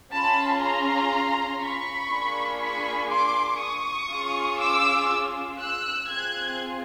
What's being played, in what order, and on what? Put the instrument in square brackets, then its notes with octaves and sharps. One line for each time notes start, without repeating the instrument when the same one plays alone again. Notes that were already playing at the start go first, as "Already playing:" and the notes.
[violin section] C#4 F4 G#4 A5 B5
A#5 C6
B5 C#6
A#3 D4 F4 G#4
B5 C#6
C6 D6
C#6 D#6
C#4 F4 G#4
D6 E6
E6 F#6
C4 F4 G#4 F#6 G#6